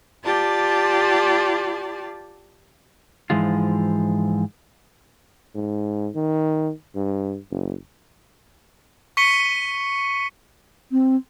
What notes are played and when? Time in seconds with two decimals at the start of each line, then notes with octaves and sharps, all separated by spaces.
0.25 F4 G4 D5 A5
3.30 G#2 E3 F3 G#3 F4
5.55 G#2
6.15 D#3
6.95 G2
7.51 F#1
9.17 C#6 B6 C#7 D#7 G7
10.92 C4